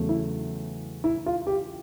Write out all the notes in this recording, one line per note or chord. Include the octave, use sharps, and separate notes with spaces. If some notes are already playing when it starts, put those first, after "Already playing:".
Already playing: E2 C#3 F#3 A3
E4
E4
F4
G4